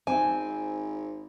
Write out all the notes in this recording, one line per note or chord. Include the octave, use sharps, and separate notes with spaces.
G#1 C4 G#5